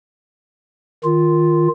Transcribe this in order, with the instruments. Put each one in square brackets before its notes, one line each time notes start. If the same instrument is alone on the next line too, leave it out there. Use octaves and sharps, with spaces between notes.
[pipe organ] D#3 F4